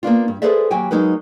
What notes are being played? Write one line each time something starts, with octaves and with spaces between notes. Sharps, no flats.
A#3 B3 D4 F4
G2
G#4 A4 B4 C5 D5 E5
D#2 F#3 G4 G5 G#5
F#3 G#3 D#4 A#4 B4